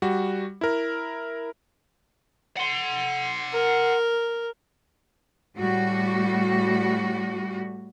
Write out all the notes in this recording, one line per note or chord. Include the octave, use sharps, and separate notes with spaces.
G3 F#4
E4 A#4
F#5 C6
A#4
A2 G3 F#4